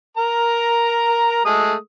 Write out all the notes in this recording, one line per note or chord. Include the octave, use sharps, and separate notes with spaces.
A#4 A#5
G#3 A3 D#6